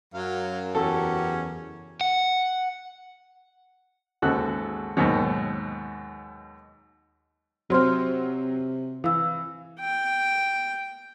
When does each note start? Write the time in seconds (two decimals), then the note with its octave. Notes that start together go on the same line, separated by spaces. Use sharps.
0.14 F#2 F#3 F5
0.75 E2 C#3 E3 C#4 F#4 G4 A4
2.01 F#5
4.22 G#1 D#2 C#3 F#4 A4 F#6
4.97 D#2 G#2 B2 D#3 F#3
7.70 C3 F#3 C4 C5 C6 F6
9.04 E3 F5 E6
9.80 G5